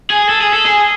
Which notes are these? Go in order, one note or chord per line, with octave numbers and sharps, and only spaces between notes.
G#4
A4
G#4
A4
G#4